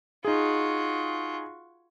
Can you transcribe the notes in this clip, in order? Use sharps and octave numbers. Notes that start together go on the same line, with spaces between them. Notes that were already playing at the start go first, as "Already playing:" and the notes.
D#4 F4 F#4 G#4